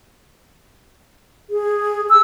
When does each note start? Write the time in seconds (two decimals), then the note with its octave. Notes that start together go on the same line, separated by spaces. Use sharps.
1.50 G#4
2.10 E6